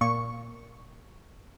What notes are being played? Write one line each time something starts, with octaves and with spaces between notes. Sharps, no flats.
A#2 C#6